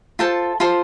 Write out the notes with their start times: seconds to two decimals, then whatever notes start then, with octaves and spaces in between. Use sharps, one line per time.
0.19 F4 A4 C5 A5
0.60 F4 A4 C5 C6